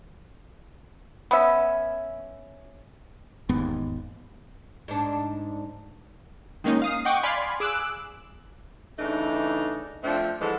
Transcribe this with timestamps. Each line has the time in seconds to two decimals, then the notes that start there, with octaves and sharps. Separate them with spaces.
1.31 B3 C#4 E5
3.49 E1 D#2 G#2 B3
4.88 G#2 D4
6.64 D#3 G#3 A#3 C#4 D#4
6.82 F5 D#6 C7
7.05 D#5 F#5 G5 C#6 D6
7.23 D5 F5 G#5 B5 C6
7.60 G#4 D6 E6 F#6
8.99 C#3 E3 A3 D4 D#4
10.04 F3 A3 C4 D4
10.41 D3 E3 F3 G#3 A4